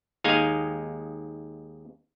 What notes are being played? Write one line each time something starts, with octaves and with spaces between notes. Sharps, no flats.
D#2 G#3 D#4 G#4 F5 G#5